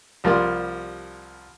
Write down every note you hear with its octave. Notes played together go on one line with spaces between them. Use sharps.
C2 F3 G3 A#3 D5 C6